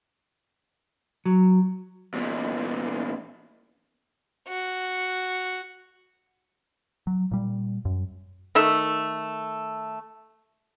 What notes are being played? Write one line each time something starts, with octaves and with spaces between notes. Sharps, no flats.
F#3
E2 A#2
F#4
F#3
A#2 G3
F#2
D#3 A3 E5